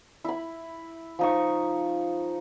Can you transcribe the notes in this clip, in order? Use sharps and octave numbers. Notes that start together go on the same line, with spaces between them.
E4 B5
F3 D#4 C#6